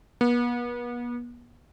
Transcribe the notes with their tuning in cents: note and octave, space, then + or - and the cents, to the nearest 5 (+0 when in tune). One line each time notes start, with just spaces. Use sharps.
B3 -40